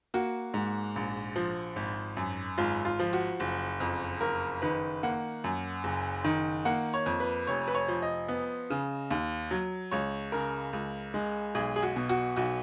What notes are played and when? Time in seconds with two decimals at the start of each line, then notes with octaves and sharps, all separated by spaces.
0.14 A#3 F#4
0.54 G#2
0.96 A#1
1.36 F3
1.76 G#1
2.17 F#2
2.58 G#1 F4
2.85 F4
3.00 F3
3.13 F#4
3.40 F#1
3.80 F2
4.21 F#1 A#4
4.62 D#3 B4
5.03 A#3 F#5
5.44 F#2
5.84 F#1
6.25 D#3
6.65 A#3 F#5
6.94 C#5
7.06 F2
7.20 B4
7.47 F1 C#5
7.68 B4
7.75 C#5
7.88 F3
8.02 D#5
8.29 B3
8.70 C#3
9.11 D#2
9.51 F#3
9.91 C#2 C#5
10.32 C#3 A#4
10.73 C#2
11.14 G#3
11.55 B1 G#4
11.76 G#4
11.83 F#4
11.96 B2
12.09 F#4
12.36 B1 F#4